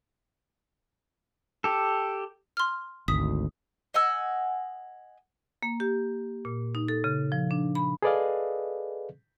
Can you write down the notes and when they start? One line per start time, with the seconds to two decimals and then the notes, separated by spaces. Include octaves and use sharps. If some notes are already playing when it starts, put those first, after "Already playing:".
1.64 G4 A4
2.57 C6 F6
3.08 G#1 D2 D#6 B6
3.94 D#5 F#5 G#5 E6
5.63 A#3
5.80 G4
6.45 A#2
6.75 D#4
6.88 A4
7.04 C#3
7.32 F3
7.51 D4
7.75 B5
8.02 G#4 A4 B4 D5 D#5 F5